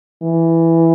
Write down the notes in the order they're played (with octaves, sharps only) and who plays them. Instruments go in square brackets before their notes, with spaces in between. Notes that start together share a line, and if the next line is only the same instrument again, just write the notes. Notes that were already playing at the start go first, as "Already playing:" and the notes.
[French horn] E3